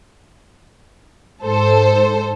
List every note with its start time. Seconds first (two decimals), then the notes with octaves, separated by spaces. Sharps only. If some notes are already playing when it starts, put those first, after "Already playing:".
1.42 G#2 A4 C5